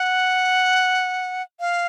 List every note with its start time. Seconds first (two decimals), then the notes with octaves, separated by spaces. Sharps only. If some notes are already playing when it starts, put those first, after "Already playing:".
Already playing: F#5
1.60 F5